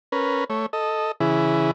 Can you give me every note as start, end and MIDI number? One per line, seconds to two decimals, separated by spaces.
0.12 0.44 61
0.12 0.44 70
0.12 0.44 71
0.50 0.66 57
0.50 0.66 73
0.73 1.12 69
0.73 1.12 75
1.20 1.71 49
1.20 1.71 52
1.20 1.71 64
1.20 1.71 68